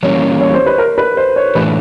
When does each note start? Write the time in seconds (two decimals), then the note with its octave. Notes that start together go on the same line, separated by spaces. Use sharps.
0.03 E3 G3 A#3 C#4 C#5
0.41 C#5
0.54 C5
0.66 B4
0.78 A#4
0.98 B4
1.17 C5
1.36 C#5
1.55 A2 E3 A3 D4 B4